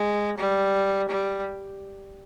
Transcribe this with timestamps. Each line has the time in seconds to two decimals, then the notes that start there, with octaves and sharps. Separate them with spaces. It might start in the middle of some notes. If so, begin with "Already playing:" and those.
Already playing: G#3
0.38 G3
1.09 G3